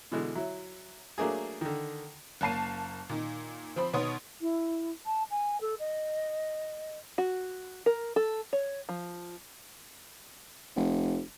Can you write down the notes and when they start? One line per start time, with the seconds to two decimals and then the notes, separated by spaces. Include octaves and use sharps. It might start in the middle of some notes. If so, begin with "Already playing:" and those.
0.12 B2 D3 E3 G#3
0.35 F#3 E4
1.18 F#3 A3 A#3 D4 G#4
1.61 D3 D#3
2.41 F#1 A#3 A5 C7 D#7
3.09 A#2 D#3
3.76 F3 C4 C5 B5
3.93 B2 D#3 B3 C#5 C6 D#6
4.41 E4
5.06 A5
5.31 G#5
5.61 A4
5.80 D#5
7.18 F#4
7.86 A#4
8.16 A4
8.53 C#5
8.89 F3
10.76 F1